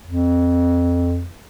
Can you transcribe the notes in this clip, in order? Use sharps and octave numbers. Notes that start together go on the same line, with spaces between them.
F2